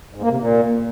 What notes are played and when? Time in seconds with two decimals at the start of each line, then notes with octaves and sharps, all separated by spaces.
0.14 G#2
0.22 A#3
0.30 C3
0.38 A#2